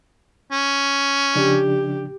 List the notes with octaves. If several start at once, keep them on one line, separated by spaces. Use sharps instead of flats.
C#4
C#3 F3 D4 G4